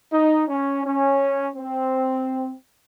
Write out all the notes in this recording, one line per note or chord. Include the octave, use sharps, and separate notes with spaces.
D#4
C#4
C#4
C4